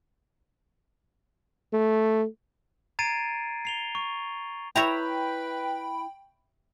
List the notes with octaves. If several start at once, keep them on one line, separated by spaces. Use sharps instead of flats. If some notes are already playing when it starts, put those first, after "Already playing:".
A3
A#5 G#6 A6 C7 D7 D#7
C7 F7 G7
C#6
E4 B4 C#5 E5 G5 A#5 B5